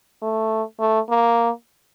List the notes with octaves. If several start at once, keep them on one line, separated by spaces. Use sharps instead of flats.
A3
A3
A#3